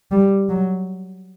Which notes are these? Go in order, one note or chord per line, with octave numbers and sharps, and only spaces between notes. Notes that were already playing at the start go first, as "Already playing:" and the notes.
G3
F#3